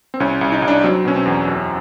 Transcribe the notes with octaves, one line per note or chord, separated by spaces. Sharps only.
C4
C2 C#4
C2
D#4
C2
D4
F#3 C4
B2 C#4
C4
E2
F#2